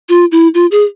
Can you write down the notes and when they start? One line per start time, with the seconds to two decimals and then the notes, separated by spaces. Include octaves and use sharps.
0.09 F4
0.32 E4
0.54 F4
0.71 G#4